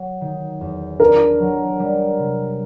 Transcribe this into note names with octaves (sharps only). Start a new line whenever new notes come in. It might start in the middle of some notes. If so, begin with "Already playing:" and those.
Already playing: F#3
D#3
E2
D4 A#4
F#3
G3
C3